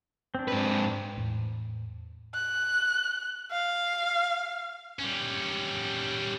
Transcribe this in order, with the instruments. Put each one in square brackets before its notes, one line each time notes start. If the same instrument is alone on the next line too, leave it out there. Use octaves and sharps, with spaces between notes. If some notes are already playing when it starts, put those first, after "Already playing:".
[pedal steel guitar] C4 D4
[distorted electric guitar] G#2 B4
[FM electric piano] E2 A2
[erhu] F#6
F5
[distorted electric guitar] G3 C#4